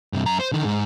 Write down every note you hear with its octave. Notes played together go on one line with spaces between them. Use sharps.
G2 C3
F#2 A#5
C5
D3 D#3
G#2